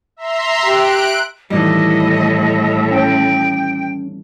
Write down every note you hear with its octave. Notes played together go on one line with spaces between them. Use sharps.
E5 A#5 C6
G4 F#6 D7
A2 D#3 E3 G3 D#5
C#4 G5